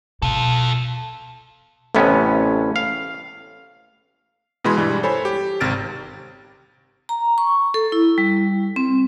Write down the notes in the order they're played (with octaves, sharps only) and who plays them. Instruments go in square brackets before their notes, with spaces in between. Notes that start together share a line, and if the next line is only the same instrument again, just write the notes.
[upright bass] B2 [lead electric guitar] F4 A4
[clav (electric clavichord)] A1 A2 C3 B3 C#4
F5
[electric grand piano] B2 E3 G#3 B5 C6 G#6
G2 E3 G3
A4 C5 C#5 G#5 B5
G4
G#1 C3 F6 A6 A#6 D7
[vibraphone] A#5
C#6
A4
E4
G3
C4